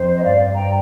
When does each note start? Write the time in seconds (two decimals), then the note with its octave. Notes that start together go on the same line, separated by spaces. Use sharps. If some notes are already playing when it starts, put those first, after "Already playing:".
Already playing: F2 C5
0.14 D#5
0.23 G2 D5 F5
0.53 G5 A#5